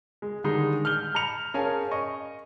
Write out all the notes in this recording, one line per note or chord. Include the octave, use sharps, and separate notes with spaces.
G#3
D3 D#3 G3 G#3 D#4
F6 G6 G7
A#5 B5 C#7 F7
C#4 G#4 A#4 F5 G#5 A5
D#5 C#6